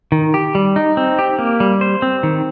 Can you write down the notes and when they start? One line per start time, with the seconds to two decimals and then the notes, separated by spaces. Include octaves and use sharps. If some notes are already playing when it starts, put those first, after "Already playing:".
0.12 D#3
0.34 G4
0.55 G3
0.76 D#4
0.97 C4
1.19 G4
1.39 A#3
1.60 G3
1.81 C5
2.02 C4
2.23 D#3